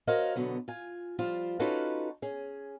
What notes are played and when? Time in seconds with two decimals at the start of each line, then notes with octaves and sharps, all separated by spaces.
0.07 F#4 A#4 C5 C#5 D#5 F5
0.36 B2 D3 F#3 B3
0.68 F4 G#5
1.19 F3 G3 F4 C5
1.60 C#4 D#4 F4 F#4 A4 B4
2.22 C#4 G#4